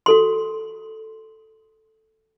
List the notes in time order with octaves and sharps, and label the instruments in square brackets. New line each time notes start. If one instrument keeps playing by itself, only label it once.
[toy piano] F#4 A4 C6